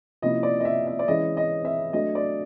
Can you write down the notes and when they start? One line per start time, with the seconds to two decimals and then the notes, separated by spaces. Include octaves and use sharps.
0.22 C3 F3 A#3 C#4 E4 D#5
0.43 D5
0.60 D#5
0.65 E5
0.87 E5
0.99 D5
1.08 E3 G#3 C#4 E4 D#5
1.37 D#5
1.65 E5
1.93 F#3 A3 D4 D#5
2.15 D5